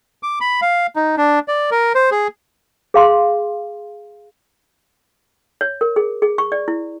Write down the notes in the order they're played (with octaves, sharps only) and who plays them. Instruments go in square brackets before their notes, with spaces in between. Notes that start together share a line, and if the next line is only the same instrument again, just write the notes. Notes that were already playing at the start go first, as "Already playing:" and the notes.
[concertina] D6
B5
F5
D#4
D4
D5
A#4
C5
G#4
[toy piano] G#4 F5 C6
C#5
A#4
G#4
G#4
C#6
D5
E4